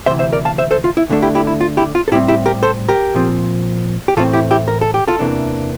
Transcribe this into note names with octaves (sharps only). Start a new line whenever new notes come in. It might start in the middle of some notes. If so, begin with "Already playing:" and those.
D2 C3 E3 C5 E5
C5 E5
A#4 D5
F5 A5
C5 E5
A4 C5
F4
E4
D2 D3 A3 D4 A4
E4 G4
E4 G4
E4
F4
E4 G4
F4
A4
A2 G3 C4 E4 G4
E4 G4
G4 A#4
A4 C5
G4 A#4
A#2 F3 C4
G4
A2 E3 A3 C4 F4 A4
E4 G4
E4 G4
A#4
A4
G4
F4 A4
E2 C3 E3 A#3 D4